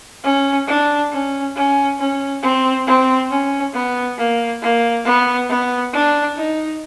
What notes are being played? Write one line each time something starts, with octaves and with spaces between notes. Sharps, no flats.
C#4
D4
C#4
C#4
C#4
C4
C4
C#4
B3
A#3
A#3
B3
B3
D4
D#4